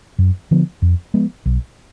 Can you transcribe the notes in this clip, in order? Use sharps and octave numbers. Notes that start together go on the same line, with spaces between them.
F#2
D3 F3 B3
F2
F3 G#3 B3
B1